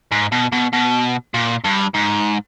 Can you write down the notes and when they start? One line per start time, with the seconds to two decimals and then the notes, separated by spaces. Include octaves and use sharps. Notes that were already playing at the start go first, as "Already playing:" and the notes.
0.12 G#2
0.32 B2
0.52 B2
0.73 B2
1.34 A#2
1.64 G2
1.94 G#2